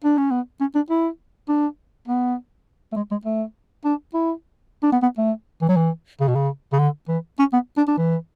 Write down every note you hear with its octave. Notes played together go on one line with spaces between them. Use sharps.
D4
C#4
B3
C#4
D4
E4
D4
B3
A3
G#3
G#3
A3
D4
E4
D4
B3
B3
A3
E3
F#3
E3
C#3
B2
C#3
C#3
D3
E3
C#4
B3
D4
D4
E3